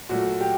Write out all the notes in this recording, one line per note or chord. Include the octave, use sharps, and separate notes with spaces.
A#2 F#3 A3 F#4
G4